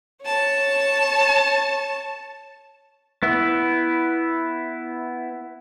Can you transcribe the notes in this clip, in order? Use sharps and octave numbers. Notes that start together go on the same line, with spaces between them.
C#5 A5
B3 E4